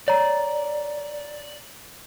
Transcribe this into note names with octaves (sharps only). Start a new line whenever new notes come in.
C#5 D5 A#5